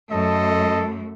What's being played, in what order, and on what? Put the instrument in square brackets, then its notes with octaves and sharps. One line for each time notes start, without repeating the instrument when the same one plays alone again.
[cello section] F#2 A3 [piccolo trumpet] A4 [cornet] D#5